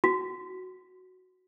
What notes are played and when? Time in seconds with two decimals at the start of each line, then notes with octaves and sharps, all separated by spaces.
0.04 F#4